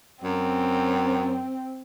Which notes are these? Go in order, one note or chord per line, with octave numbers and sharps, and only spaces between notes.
F#2 C4